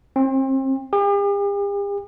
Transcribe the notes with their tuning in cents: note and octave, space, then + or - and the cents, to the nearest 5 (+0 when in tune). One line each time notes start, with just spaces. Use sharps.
C4 +35
G4 +45